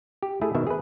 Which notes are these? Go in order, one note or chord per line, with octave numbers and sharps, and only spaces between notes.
G4
A3 E4 G#4
B2 D#3 E5
G#4 B4